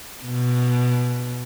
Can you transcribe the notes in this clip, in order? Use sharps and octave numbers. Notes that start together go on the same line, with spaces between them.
B2